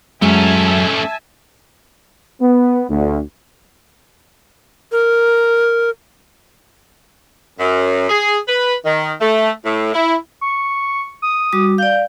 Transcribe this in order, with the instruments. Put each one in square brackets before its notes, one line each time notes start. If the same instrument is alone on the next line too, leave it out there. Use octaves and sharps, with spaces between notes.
[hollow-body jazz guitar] F#2 [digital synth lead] G#3 [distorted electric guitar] A3 C#4 [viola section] E5 G#5 A5
[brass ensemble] B3
D2
[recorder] A#4
[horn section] F#2
G#4
B4
D#3
A3
A2
E4
[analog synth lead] C#6
D#6
[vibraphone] G3 F#4 D6
[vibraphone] D5 F5 [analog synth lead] G6